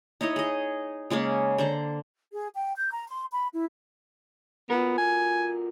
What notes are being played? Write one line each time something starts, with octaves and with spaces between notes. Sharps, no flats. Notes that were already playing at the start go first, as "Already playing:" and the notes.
D#4 E4 C#5 D#5
G#4 D#5
C#3 G#3 A#3 C#4
D3 C5 A#5
G#4
G5
G6
A#5
C6
B5
E4
B3 F4 F#4 A#4
G#5